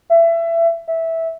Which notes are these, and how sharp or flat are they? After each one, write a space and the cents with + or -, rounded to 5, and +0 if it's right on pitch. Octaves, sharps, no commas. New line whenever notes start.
E5 +25
E5 -10